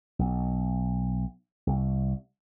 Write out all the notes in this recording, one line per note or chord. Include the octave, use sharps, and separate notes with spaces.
B1
C2